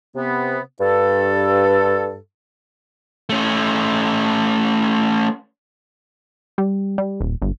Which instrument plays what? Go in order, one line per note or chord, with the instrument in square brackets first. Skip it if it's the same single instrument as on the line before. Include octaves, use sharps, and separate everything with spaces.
[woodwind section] C3 B3
G2 A4
[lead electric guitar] A3 C#4
[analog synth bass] G3
G3
D#1
G1